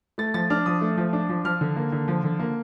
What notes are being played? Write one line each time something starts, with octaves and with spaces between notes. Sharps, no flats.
A3 A6
F3 A6
D4 F6
F3 D#6
A3
F3
D4
F3
F3 F6
D3
A#3
D3
F3
D3
A#3